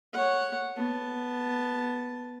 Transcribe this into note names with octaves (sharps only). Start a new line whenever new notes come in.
C#5 F#5
B3 A5